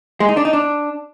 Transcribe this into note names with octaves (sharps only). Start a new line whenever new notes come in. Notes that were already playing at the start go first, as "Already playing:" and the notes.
G#3
D#4
D4
D#4
D4